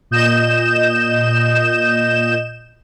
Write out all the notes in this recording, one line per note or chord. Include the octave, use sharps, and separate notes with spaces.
A#2 D#5 G6 E7